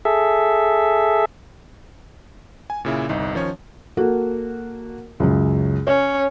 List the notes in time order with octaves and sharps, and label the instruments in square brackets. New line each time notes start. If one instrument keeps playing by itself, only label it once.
[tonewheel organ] G#4 A4 E5
[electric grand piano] G#5
A#2 C#3 E4
G1 C2 D#4
D#3 F3 C#4 C#5
[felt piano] A#3 F#4 A4
C#2 F#2 C#3
[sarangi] C#4 [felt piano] C#5